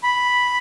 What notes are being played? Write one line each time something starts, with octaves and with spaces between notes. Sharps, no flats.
B5